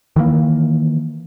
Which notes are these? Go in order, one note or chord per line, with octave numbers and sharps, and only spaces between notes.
D#3 E3 G3 A#3